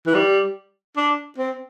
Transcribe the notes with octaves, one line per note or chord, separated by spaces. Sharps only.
E3
G3
D4
C4